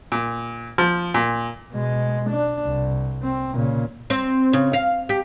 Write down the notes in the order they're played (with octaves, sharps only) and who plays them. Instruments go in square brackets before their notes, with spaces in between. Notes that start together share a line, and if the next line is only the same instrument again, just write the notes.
[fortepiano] A#2
F3
A#2
[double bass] B2 G#3
D4
C2
C4
A#2 C#3
[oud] C4
C#3
F5
G4